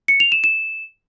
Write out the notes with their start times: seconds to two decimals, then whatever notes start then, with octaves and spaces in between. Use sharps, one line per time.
0.08 C#7
0.20 F7
0.32 E7
0.44 E7